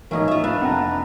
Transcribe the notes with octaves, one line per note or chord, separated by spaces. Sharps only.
A2 E3 A#3 C#4 D#4 D#5
F4 E5
A#1 D4 B4 E5 F5 F6
F2 C3 F#5 G5 A#5